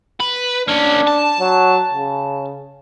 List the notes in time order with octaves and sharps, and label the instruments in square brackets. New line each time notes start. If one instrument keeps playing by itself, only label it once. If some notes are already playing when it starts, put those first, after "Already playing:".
[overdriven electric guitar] B4
[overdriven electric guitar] A#3 C#4 [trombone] D4
[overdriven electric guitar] A5
[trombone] F#3
C#3